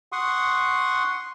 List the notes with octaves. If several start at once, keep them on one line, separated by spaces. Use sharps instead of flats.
F#5 C6 C#6 D#6